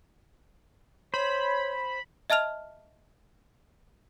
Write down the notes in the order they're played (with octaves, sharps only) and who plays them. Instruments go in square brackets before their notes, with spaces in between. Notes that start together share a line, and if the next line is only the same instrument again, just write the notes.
[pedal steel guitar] C5 [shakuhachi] C#5 [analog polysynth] B5
[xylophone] D#5 E5 A5 F6 F7